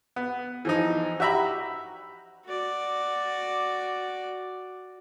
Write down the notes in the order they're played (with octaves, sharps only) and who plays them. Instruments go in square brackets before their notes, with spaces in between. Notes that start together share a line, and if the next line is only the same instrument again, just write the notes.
[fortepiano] B3
E3 F3 D#4
F#4 G4 E5 A#5 B5
[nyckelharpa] F#4 D5